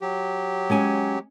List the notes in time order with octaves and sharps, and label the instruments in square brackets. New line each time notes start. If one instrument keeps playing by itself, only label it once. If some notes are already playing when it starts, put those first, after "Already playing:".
[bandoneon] F#3 G4
[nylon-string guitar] G#3 C#4 G#5